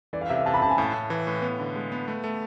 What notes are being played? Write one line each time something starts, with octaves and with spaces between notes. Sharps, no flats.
E3 D5
F5
C3 E5
F5
C3 A5
B5
C3 A5
G#5
A2 A5
A2
E3
A2
B3
D3
G#3
B3
A3
A3